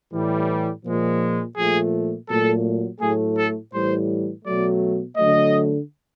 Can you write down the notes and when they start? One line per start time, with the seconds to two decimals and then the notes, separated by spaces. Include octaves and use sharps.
0.12 A2 E3 G3
0.84 A#2 F3 G#3
1.56 A#2 F3 A3 G#4
2.28 A#2 F#3 A3 A4
3.00 A2 F#3 A3 G#4
3.37 A4
3.72 A2 E3 G3 C5
4.44 B2 F#3 A3 D5
5.17 D3 F#3 A3 D#5